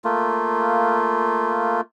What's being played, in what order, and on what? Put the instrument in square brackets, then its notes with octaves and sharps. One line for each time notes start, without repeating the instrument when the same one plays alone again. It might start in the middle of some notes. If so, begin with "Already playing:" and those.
[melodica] A3 A#3 F4